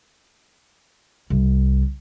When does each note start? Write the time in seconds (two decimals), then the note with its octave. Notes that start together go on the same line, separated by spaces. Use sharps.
1.30 C2